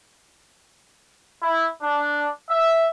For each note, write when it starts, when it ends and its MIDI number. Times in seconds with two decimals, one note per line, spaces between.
1.41 1.68 64
1.82 2.29 62
2.49 2.88 76